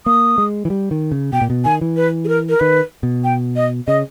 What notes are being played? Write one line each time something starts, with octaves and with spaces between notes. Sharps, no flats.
A#3 D#6
G#3
E3
G3
D#3
C#3
B2 G5
A#2
B2
D#3 G#5
E3
B4
G#4
A#4
A#4
D#3 B4
B2
G5
D#5
C#3 D#5